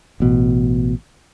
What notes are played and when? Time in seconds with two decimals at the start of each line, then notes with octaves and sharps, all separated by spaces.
0.20 A1 B2